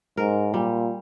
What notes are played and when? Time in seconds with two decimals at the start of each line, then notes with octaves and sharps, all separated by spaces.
0.17 G#2 A#4
0.53 A#2 G3